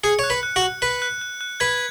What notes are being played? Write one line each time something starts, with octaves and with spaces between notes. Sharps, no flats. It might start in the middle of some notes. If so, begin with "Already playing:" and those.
G#4 C#7
C#5 F#6
B4
F#6
F#4
F#6
B4 F#6
F#6
F#6
F#6
B4 G#6